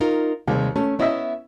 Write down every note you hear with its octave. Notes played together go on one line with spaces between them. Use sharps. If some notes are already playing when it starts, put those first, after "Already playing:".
D#4 F4 A#4
D#2 C3 G3 G#3
A3 C#4
B3 C#4 E4 D#5 E5